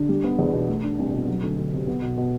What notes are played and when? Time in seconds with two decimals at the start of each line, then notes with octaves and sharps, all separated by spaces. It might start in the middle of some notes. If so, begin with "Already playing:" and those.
Already playing: D3
0.09 G3
0.24 B3
0.39 E2
0.53 B2
0.68 A3
0.83 D4
0.98 C2
1.12 B2
1.28 F#3
1.42 D2
1.57 D2
1.72 C3
1.87 B3
2.02 B2
2.17 B2